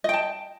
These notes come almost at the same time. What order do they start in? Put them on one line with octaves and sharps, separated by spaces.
D#5 G5 A5